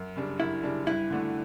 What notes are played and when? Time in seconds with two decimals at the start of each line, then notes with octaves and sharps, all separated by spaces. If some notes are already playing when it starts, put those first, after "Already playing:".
Already playing: F#2
0.16 C#3 G3 D4
0.40 F#2 E4
0.63 C#3 G3 D4
0.87 G2 E4
1.10 D3 A3 D4 F#4